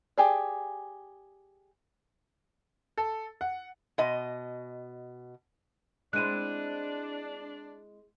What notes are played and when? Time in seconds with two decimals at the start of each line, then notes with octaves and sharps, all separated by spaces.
0.18 G4 G#4 D5
2.98 A4
3.41 F#5
3.98 B2 D#5
6.13 G#3 C4 D4 E4 F#6 D#7